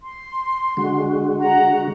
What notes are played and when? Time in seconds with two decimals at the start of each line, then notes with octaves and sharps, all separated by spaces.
0.02 C6
0.77 D3 G#3 F#4
1.39 F#5 A#5